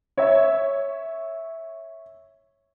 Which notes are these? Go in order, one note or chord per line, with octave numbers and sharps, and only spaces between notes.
C#5 E5